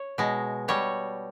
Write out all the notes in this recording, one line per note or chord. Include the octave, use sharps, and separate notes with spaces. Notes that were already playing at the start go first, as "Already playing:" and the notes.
Already playing: C#5
B2 G#3
B2 G3 C#5